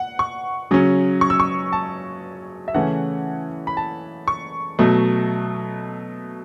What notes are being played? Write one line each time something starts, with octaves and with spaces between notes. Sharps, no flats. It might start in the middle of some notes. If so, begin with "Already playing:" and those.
Already playing: F#5
C#6
C#3 F#3 C#4
C#6
E6
C#6
A5
E5
C#3 E3 A3 C#4 F#5
B5
A5
C#6
B2 F#3 A3